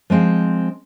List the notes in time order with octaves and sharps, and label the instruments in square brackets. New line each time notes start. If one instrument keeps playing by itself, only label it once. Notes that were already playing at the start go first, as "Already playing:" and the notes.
[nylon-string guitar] F3 G#3 C4 F5